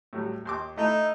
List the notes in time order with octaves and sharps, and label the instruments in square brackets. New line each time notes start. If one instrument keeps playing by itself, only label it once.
[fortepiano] A2 F#3 G3
D#2 C6 D6
[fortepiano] A3 E4 [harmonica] D#4